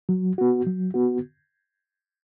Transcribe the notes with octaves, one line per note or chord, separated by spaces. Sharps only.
F#3
B3 F#4
F#3
B3 F#4